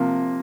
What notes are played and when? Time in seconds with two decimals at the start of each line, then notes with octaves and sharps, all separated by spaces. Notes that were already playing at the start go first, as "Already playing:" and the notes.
Already playing: C3 F3 A#3